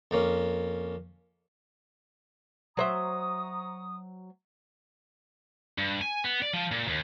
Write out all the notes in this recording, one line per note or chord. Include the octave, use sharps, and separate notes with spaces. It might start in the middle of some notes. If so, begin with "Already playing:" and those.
F2 A#3 C#4
F#3 C5 E5 A#5 C#6 D#6
G2
G#5
B3
D5
F3
A#2
D#2